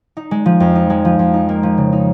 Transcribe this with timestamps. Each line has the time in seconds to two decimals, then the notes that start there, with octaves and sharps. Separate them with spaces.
0.17 D#4
0.31 G#3
0.46 F3
0.60 F2
0.75 D#4
0.90 G#3
1.05 F3
1.19 F2
1.34 D#4
1.49 A#3
1.63 F3
1.78 C#3
1.92 D#4